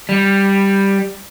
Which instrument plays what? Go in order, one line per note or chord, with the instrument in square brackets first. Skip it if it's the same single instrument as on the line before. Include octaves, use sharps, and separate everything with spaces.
[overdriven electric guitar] G3